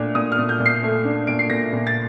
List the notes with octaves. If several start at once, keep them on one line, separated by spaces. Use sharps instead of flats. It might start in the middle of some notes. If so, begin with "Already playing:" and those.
Already playing: A#2 A3 D4
A#2 D#6
F6
A#2
G6
A#2
C7
A3
D4
A#2 D7
C7
A#2 A#6
A#2
A6